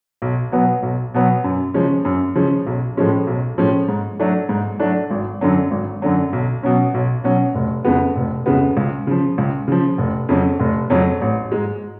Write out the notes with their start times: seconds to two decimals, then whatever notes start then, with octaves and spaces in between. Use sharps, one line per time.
0.22 B1
0.52 B2 F#3 B3
0.83 B1
1.14 B2 F#3 B3
1.44 F#2
1.74 C#3 F3 G#3 C#4
2.05 F#2
2.35 C#3 F3 G#3 C#4
2.67 B1
2.97 A2 F3 G#3 C#4
3.27 B1
3.58 A2 F3 G#3 C#4
3.88 G#2
4.19 F#3 A3 D4
4.49 G#2
4.79 F#3 A3 D4
5.10 G#1
5.41 F#2 D3 F#3
5.71 G#1
6.02 F#2 D3 F#3
6.33 B1
6.63 B2 F#3 C#4
6.94 B1
7.24 B2 F#3 C#4
7.55 F1
7.85 F2 C#3 G#3 B3
8.16 F1
8.46 F2 C#3 G#3 B3
8.77 C#2
9.07 C#3 F3
9.38 C#2
9.68 C#3 F3
9.98 F1
10.29 F2 C#3 F#3 C#4
10.60 F1
10.90 F2 C#3 F#3 C#4
11.21 A1
11.52 G#2 G#3